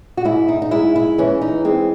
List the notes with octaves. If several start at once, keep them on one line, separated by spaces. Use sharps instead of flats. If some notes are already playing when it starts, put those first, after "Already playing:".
F#4
G#2 E4
D#4
D#4
G#3 E4
E4
E3 C#4
D#4
G#3 C4